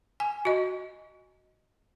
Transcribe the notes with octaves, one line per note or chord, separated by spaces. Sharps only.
G#5
F#4 D#5